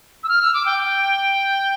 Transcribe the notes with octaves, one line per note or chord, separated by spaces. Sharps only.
E6
F6
E6
D6
G5
G5